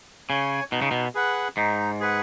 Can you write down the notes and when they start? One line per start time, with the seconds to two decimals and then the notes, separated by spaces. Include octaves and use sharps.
0.29 C#3 C#5 G#5
0.71 B2 D#4
0.82 C#3
0.91 B2
1.15 G#4 B4 F#5
1.57 G#2 D#4
2.00 G#4 B4 F#5